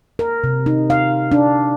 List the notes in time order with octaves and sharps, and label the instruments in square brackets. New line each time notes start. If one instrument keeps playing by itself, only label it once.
[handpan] A#4
C3
D#4
F5
D4